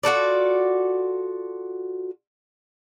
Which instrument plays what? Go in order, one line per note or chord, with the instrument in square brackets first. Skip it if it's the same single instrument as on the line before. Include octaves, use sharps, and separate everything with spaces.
[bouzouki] F4 F#4 A4 D5